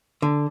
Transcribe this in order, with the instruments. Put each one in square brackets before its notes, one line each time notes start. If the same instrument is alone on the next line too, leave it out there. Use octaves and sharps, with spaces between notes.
[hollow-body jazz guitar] D3